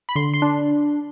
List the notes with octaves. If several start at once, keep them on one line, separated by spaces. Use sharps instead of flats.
B5
D3 C6
C6
D4